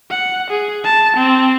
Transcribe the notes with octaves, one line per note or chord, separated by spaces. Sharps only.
F#5
G#4
A5
C4